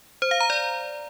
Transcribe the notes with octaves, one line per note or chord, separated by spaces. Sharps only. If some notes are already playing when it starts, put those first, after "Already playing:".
C5
F5
A#5
D5